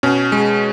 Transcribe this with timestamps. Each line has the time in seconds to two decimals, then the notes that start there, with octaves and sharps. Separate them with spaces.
0.03 B2 C#4
0.32 G#3